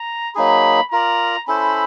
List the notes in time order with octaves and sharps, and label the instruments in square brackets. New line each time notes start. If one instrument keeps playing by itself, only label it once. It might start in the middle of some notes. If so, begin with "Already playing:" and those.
Already playing: [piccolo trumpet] A#5
[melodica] F#3 A#3 D#4 G#4 [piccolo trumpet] B5
[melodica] F4 A#4 D5 [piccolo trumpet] A#5
[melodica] C#4 E4 A4 C5 [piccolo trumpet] B5